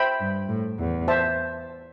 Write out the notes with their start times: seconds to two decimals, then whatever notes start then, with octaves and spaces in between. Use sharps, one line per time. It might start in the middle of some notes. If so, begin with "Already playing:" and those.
Already playing: C5 E5 G5 B5
0.20 G2
0.49 A2
0.79 E2
1.08 C5 E5 A5